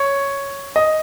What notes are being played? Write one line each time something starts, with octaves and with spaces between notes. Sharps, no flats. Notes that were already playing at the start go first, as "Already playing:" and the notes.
Already playing: C#5
D#5